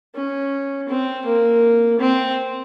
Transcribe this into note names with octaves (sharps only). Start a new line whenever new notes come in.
C#4
C4
A#3
C4